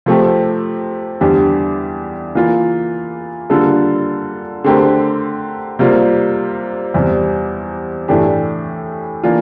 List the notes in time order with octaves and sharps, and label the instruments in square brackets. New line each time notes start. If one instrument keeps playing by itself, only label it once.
[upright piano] C3 F3 A3 C4 G4
E2 D3 G3 D4 G4
E3 A#3 F4
D3 G3 A#3 F4 A4
D3 A3 C4 G4 A#4
C3 G3 A#3 F4
E2 C3 G3
A2 E3 A3 D4 G4
E3 A#3 D4 F4